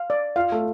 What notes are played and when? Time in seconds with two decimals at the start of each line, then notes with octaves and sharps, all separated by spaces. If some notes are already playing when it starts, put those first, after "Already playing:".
Already playing: F5
0.10 D5
0.36 F4 F5
0.52 A3